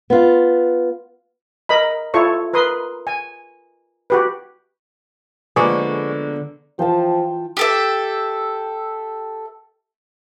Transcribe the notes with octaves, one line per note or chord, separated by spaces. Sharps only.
B3 F4
A#4 D#5 B5
E4 F4 A4 C#5 C#6
A#4 B4 C6 D#6
G#5
F#4 G4 B4
D3 F3 G#3 A#3 B3 G#4 D5 C#6
E3 F3 F4 G5 A5
G4 A4 E5